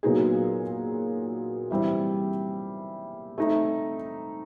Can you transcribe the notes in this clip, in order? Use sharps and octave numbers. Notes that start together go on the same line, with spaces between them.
A#2 F#3 B3 D#4 G#4
E3 G3 C4
A3 C4 D#4